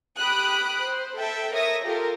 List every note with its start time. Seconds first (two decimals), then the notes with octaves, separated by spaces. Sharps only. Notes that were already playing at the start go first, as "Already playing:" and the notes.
0.18 G4 B5 D#6 F#6 D7
0.86 C5
1.18 A4 E5 G5
1.54 A#4 C#5 E5 D#6 A#6
1.85 F4 G4 A4 A#4